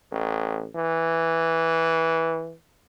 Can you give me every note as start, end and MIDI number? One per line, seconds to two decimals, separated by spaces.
0.12 0.67 33
0.76 2.54 52